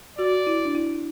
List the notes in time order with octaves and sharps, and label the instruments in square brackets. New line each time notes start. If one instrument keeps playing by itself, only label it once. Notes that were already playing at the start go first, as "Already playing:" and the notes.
[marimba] F#4 [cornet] D5
[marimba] E4
D4
E4